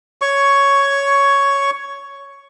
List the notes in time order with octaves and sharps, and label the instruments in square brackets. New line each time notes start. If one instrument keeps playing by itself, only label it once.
[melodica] C#5 C#6